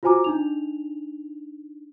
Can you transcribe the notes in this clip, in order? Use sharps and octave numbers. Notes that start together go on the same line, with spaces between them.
F4 F#4 C5 G#5 A#5 D6
D4 D#4 F7